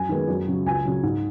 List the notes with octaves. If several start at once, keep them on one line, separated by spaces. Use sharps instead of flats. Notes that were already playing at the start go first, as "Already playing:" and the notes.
Already playing: F#2 G#5
D#3 G#3 B3
F#2
C#3 F#3
C#2 G#5
C#3 F#3
G#2